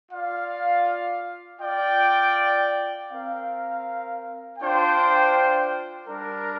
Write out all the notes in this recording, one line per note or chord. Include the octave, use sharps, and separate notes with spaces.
F4 D5 F5
F4 D5 G5
C4 A#4 F5
D4 F4 C5 G5
G3 D4 A#4